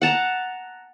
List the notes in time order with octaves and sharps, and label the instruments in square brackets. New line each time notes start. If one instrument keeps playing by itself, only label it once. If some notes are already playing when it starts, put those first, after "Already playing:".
[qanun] F#5 A5 A#5